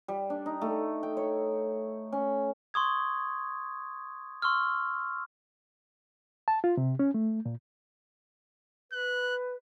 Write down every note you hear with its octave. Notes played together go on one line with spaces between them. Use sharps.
G3
D4
D#4
A3
G5
C#5
C#4
C6 C#6 D#6 G#6
C6 C#6 E6 F6
A5
F4
C3
C#4
A3
A#2
B4 F#6